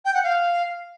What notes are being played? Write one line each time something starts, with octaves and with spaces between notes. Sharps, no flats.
G5
F#5
F5